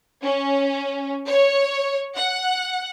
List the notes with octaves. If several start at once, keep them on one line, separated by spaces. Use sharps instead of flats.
C#4
C#5
F#5